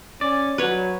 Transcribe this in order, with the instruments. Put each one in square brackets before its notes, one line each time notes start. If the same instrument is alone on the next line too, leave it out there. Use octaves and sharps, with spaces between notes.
[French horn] C#4 [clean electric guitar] D5
[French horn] F#3 [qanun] B4 C#5